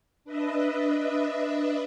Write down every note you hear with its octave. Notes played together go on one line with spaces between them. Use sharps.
D4 B4 D#5 E5